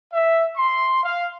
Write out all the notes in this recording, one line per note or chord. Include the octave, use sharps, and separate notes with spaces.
E5
C6
F5